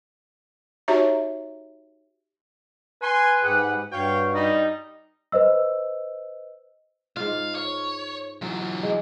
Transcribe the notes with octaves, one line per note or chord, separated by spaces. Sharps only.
D#4 F#4 G4 C#5 E5 A#5
B4 G#5 C6
G#2 G4 G#4 F#5
G2 F#4 C#5 F5 G5
G3 D#4
B4 C5 D#5 E6
G#2 F4 F5
C#5
E3 F#3 F4
G#3